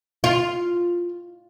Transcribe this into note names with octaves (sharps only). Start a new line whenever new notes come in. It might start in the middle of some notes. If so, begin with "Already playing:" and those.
F4